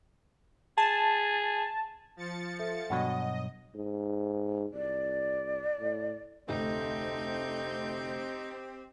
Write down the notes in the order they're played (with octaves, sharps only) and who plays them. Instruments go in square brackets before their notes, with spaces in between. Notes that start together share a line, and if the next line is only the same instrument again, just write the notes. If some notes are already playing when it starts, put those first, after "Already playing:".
[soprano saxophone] G#4 [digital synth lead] A5
[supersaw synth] F3 A6 C#7
[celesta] A4 E5
[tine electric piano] G2 B2 F#3 [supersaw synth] D#5 [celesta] F#5
[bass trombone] G#2
[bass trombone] C2 [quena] D5
[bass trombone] A2
[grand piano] F1 D2 [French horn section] A3 [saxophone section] C4 G4 [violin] D#4 G6